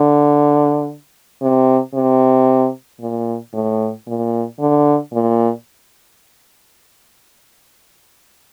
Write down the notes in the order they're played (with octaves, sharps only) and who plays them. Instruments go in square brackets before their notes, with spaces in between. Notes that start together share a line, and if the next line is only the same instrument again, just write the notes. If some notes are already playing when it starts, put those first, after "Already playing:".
Already playing: [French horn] D3
C3
C3
A#2
A2
A#2
D3
A#2